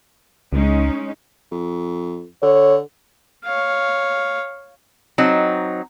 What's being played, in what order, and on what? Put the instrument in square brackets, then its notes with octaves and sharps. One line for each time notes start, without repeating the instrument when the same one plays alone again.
[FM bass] C#2 [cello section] G#3 C#4 D#4
[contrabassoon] F2
[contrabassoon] D3 [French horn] C#5
[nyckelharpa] C#5 F5
[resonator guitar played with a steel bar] F#3 C4 D#4